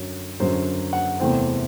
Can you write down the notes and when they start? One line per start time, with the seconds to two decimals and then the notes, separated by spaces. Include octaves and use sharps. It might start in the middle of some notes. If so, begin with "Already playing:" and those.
Already playing: F#2 D3 F#3 C#5
0.40 F#2 D3 F#3 C5
0.93 F#5
1.20 E2 C3 E3 A3 C4 G5